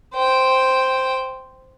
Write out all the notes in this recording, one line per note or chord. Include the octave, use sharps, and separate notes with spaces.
C5 G5